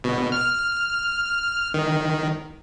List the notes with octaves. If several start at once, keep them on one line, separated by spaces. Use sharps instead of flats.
B2
F6
D#3